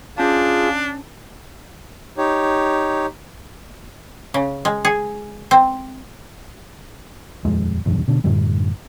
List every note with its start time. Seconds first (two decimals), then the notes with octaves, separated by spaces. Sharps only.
0.18 C#4 D4 F4 G#4 A5
2.18 D#4 G4 C#5
4.34 C#3
4.65 G#3
4.85 G#4
5.51 C4
7.45 D#1 F2 G#3
7.86 F#1 B1 E2 G2
8.08 B2 D3
8.24 F#2 A2 D3 G3